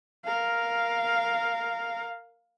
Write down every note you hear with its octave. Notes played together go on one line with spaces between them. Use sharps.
A#4 F5